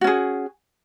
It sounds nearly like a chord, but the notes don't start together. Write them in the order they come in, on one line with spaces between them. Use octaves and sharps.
F#4 C#4 G#4